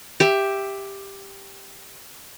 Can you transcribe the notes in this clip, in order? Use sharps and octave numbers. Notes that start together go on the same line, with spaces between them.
G4 E5